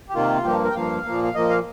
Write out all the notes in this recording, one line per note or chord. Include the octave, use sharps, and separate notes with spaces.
G4
C3 D#3 A#3 F4
G2 F3 A#3 G4
A#4
G5
G2 F3 A#3 F5
A#2 F3 A#3
F5
A#2 F3 A#3 D#5
F5